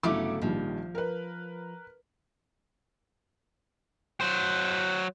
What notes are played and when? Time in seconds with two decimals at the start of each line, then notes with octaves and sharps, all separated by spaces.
0.03 G1 C#3 F#3 A3 E4 D6
0.42 A#1 D#3 F3 G3
0.95 A#4 B4
4.21 F#3 C5